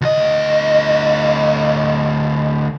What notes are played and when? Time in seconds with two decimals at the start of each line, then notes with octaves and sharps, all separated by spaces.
0.01 D2 D#5